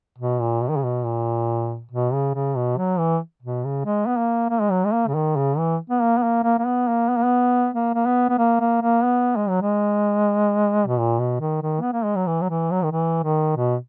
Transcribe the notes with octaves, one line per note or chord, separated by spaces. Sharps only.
B2
A#2
B2
D#3
C#3
B2
A#2
B2
C#3
C#3
B2
F#3
E3
B2
C#3
G#3
B3
A#3
A#3
G#3
F#3
G#3
A#3
C#3
D#3
C#3
E3
B3
A#3
B3
A#3
A#3
A#3
B3
A#3
B3
A#3
B3
A#3
A#3
B3
B3
A#3
A#3
A#3
B3
G#3
F#3
G#3
B2
A#2
B2
D#3
D#3
B3
A#3
G#3
F#3
E3
F#3
E3
F#3
D#3
E3
D#3
B2